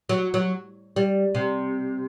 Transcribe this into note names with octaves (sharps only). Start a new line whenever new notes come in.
F#3
F#3
G3
C3